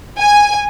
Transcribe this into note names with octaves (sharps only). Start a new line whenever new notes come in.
G#5